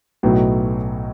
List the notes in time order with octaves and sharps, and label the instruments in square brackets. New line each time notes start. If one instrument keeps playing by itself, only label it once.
[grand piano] B1 A2 F#3 B3 D#4